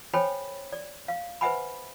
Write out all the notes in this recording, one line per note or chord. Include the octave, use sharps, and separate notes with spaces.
A4 C5 C#5 G5 G#5 B5
D5
F5
B4 C5 E5 F#5 G#5 B5